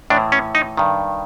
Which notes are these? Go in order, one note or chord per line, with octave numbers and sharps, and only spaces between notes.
A2 E3 D4
C#4
D#4
G2 D#3